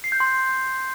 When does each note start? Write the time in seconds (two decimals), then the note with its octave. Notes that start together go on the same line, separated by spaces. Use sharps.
0.04 C7
0.12 G6
0.20 C6